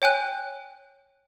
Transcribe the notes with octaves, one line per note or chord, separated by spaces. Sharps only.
C#5 G5 G#5 F#6